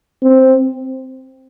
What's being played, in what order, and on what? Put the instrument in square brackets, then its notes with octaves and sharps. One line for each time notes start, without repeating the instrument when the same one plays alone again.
[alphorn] C4